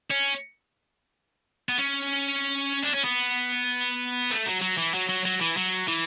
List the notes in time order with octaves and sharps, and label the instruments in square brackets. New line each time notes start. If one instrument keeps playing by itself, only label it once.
[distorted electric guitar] C#4
B3
C#4
D4
C#4
B3
A3
F#3
F#3
E3
F#3
F#3
F#3
E3
F#3
E3